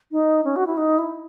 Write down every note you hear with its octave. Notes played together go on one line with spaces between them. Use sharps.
D#4
C#4
F#4
E4
D#4
E4